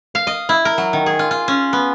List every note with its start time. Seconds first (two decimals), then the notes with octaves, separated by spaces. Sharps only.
0.15 F5
0.27 D#5
0.49 E4
0.65 A#4
0.78 F#3
0.93 D#3
1.06 G#4
1.19 F4
1.31 F4
1.48 C#4
1.73 B3